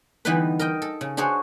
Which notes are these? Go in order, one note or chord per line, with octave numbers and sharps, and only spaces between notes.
D3 E3 G3 B3 D#4 B4
A#4 D#5 G5
A4
C#3
D4 F#4 G#4 C5 C#5